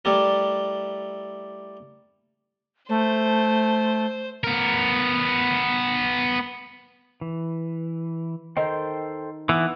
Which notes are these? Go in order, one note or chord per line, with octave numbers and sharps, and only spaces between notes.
G3 A3 E4 G4 A#4
A3 C5
B3 A#4
E3
D#3 A4 C5 G5
E3 B3